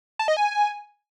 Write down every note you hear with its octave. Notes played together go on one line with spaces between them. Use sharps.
A5
D#5
G#5